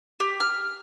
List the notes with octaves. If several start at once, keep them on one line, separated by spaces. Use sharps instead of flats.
G4
F6